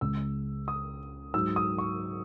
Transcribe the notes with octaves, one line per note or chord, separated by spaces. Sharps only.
C#2 C#3 G#3 E6
D#6
G#2 F#3 E6
D#6
C#6